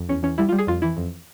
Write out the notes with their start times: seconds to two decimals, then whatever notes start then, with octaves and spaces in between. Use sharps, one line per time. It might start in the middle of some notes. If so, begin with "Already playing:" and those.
Already playing: F2
0.09 E2 C#4
0.23 E2 C#4
0.38 G3 E4
0.49 F4
0.52 G3
0.58 G#4
0.67 F2 F4
0.82 E3 E4
0.97 F2